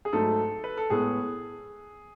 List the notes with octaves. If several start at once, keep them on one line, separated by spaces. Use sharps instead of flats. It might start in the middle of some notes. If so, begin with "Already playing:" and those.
G#4
G#2 F#3 A3 A4
B4
A4
A2 G#3 B3 G#4